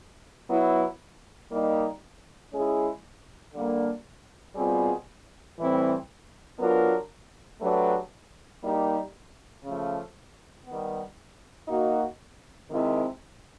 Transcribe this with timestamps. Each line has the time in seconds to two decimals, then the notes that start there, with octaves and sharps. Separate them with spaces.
0.48 F#3 B3 E4
1.50 G3 A#3 D#4
2.52 G#3 C#4 E4 G#4
3.53 D3 G3 A#3 D4
4.55 B2 G3 C4 F4 G#4
5.57 A2 E3 G3 C4 E4
6.59 F#3 B3 D4 F4 A#4
7.60 F#3 A3 D4 G4 B4
8.63 G3 A#3 D#4 G4
9.64 C#3 F3 A3
10.66 D#3 G3 B3
11.68 A#3 D#4 F#4
12.70 C3 D#3 G#3 C4 E4